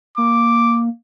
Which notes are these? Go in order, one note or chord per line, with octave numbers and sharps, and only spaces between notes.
A#3 D6